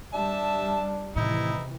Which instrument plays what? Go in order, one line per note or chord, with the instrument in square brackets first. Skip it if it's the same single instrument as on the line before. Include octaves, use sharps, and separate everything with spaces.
[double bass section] G3 [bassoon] D4 [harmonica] E5 A5
[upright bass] A2 D#3 [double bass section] C3 E3 [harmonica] D#4 E4